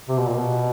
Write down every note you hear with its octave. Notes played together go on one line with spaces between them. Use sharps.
C3
B2
A#2
B2